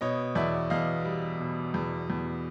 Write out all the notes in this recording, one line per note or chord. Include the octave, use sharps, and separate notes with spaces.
B2 C#5 D#5
E2 D5 E5
E2 D#5 F5
G3
B2
E2
E2